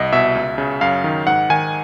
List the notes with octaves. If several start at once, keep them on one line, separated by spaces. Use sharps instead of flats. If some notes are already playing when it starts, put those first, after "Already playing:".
Already playing: C2 D#5
B2 E5
C#2
C#3
F#2 F5
D#3
G#2 F#5
D#3 G#5